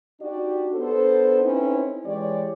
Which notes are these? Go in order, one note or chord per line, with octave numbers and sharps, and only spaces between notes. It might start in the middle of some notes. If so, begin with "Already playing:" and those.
D4 D#4 F#4 G4 D5
B3 D4 A4 C5
C4 C#4 D#4 E4 A4 B4
E3 G#3 G4 C#5 D5